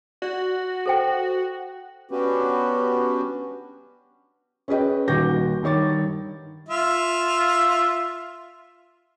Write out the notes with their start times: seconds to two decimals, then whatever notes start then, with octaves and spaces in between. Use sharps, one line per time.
0.22 F#4 D5
0.86 A4 C5 G5
2.11 B3 C#4 D4 F#4 G4 B4
4.68 C#4 G#4 B4 D#5 G5
5.08 D#1 D#2 F#4 D6 G6 A#6
5.63 G2 D#3 C#5 D6 A6
6.69 F4 E5